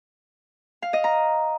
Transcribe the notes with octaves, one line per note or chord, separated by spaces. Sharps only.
F5
D#5
A#5